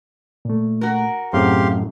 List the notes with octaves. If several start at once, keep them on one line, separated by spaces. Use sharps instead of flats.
A#2 A3
F#4 A#4
F#2 A2 C4 G4 G#4 F5 C6